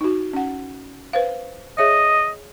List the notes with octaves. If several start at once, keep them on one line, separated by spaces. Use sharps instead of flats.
D#4 F#4
C#4 F#5
B4 C5 F5
G#4 C#5 D#5 E5